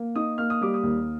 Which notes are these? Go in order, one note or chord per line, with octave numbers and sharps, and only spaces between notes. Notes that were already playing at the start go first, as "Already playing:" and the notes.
Already playing: A#3
D#4 D#6
A#3 F6
D#6
G3 D6
D#6
D#2